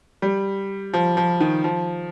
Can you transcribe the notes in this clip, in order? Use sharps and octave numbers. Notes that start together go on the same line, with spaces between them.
G3
F3
F3
D#3
F3